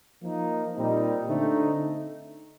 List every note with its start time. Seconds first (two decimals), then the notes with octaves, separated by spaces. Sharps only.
0.21 F3 A#3 D#4
0.75 A#2 G3 C4 D#4
1.28 D3 A3 C4 D#4